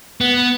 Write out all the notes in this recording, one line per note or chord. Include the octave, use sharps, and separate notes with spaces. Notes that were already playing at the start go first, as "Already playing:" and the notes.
B3